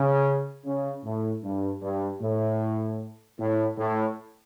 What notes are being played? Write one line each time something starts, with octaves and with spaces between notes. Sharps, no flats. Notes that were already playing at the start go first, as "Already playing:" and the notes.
Already playing: C#3
C#3
A2
G2
G2
A2
A2
A2